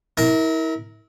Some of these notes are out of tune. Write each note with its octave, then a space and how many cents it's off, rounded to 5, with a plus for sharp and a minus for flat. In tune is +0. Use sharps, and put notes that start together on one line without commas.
E4 -35 A#4 +0